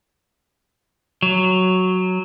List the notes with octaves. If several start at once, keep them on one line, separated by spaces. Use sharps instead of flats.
F#3